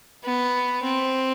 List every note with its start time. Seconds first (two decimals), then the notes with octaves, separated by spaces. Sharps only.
0.24 B3
0.84 C4